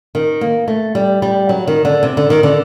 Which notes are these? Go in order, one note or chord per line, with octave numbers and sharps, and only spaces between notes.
D#3
A#3
A3
G3
G3
F#3
D#3
D3
C3
D3
D#3
D3